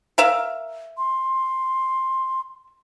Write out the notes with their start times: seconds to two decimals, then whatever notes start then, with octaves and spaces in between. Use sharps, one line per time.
0.18 A#4 E5 F5
0.97 C6